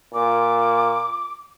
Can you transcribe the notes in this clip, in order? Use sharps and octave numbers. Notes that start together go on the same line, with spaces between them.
A#2 D6